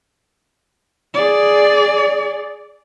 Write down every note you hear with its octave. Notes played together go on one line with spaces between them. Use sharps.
G#4 D5